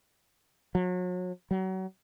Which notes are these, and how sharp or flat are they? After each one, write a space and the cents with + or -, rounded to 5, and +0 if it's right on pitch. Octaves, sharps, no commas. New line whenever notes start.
F#3 -35
F#3 +30